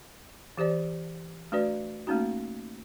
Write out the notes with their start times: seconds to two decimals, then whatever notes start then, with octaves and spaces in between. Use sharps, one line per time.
0.57 E3 G4 C5 D5
1.52 A3 D4 F#4 B4 D5
2.07 A3 A#3 C#4 D#4 F#4